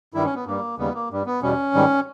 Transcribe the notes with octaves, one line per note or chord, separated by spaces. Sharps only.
G2 D#3 G3 E4
C#4
B3
G2 G3 A#3
D#2 C#3 G3 B3
A#3
G2 G3
B3
E2 B2 G3 C#4
G#2 D#3 G3